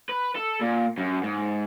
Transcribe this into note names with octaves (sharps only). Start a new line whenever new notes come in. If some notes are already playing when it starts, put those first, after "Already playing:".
B4
A4
A#2
F#2
G#2